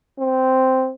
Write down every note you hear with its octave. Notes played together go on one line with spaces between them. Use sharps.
C4